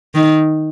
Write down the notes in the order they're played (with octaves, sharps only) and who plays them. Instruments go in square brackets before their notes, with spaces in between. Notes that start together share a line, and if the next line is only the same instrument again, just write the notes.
[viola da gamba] D#3